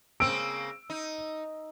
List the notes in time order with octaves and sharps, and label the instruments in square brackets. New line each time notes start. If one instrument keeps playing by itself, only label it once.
[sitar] C#3 A#3 C4 [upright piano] E6 D7
[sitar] D#4